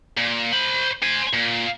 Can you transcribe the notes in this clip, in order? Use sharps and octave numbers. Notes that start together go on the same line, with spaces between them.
A#2
C5 B5
C5 G#5
A#2